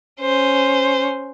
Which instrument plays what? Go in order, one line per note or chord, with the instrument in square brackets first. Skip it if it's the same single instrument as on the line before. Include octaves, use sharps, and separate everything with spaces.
[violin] C#4 C5